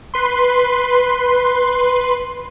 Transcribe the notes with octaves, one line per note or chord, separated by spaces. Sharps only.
B4 C6